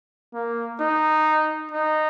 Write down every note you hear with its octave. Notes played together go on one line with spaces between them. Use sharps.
A#3
D#4
D#4